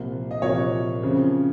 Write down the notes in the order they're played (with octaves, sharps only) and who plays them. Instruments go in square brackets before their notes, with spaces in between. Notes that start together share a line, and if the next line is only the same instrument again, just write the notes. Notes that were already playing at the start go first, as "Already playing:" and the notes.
Already playing: [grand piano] C2 A#2 F3 A#3
D#5
C2 A#2 F3 A#3 C#5
F2 C#3 F3